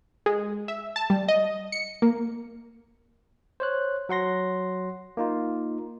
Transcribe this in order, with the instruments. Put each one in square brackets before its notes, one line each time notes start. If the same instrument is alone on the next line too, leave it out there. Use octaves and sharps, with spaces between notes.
[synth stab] G#3
E5
A5
G3
D#5
C#7
A#3
[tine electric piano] C5 C#5 F#6
F#3 F#5 C6 A#6
A#3 D#4 F4